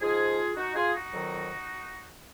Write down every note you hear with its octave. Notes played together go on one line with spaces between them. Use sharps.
G#2 F3 F4 G#4
D#4 F#4
F4 G#4
D#4 F#4
F2 D#3 F#3